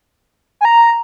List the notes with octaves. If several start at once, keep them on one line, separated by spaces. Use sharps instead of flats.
G#5
A#5